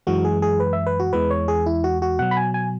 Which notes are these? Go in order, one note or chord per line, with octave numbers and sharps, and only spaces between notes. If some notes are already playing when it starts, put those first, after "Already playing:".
F#2 E3 G#3 F#4
G#4
G#4
B4
E5
B4
F#4
E2 E3 G#3 B4
C#5
G#4
E4
F#4
F#4
B2 F#3 F#5
B5
G#5
G#5